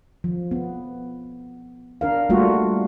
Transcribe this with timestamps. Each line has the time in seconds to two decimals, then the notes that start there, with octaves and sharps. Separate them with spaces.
0.24 F3
0.51 B3
2.01 D4 A#4 F5
2.29 G3 A3 A#3 F4 F#4